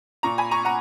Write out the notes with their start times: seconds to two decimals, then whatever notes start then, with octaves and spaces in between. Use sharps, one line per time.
0.23 A#2 A#5 C#6
0.38 G#5 B5
0.51 A#5 C#6
0.65 F#5 A#5